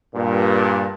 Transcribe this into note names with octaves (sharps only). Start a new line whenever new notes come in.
G2 A#2